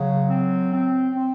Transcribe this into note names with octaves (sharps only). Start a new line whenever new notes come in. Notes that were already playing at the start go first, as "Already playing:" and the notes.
Already playing: C#3 F#3
C4
C4
C4